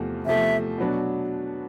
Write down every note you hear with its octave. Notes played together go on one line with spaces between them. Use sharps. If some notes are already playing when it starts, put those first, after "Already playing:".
Already playing: E2 C3 F3 A3
E2 C3 F3 A3 E5
B2 F#3 B3 D4 F#4